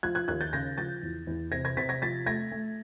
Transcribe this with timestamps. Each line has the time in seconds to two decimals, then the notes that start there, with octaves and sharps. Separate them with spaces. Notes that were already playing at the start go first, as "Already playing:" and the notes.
0.03 F3 F#6 G#6
0.15 F#6 G#6
0.28 D#2 F#6 G#6
0.41 G6 A6
0.53 C#3 G#6 A#6
0.78 F3 G6 A6
1.03 E2
1.27 E2
1.52 C3 G#6 A#6
1.65 G#6 A#6
1.77 C3 A6 B6
1.89 G#6 A#6
2.02 F3 A6 B6
2.26 A3 G#6 A#6
2.52 A3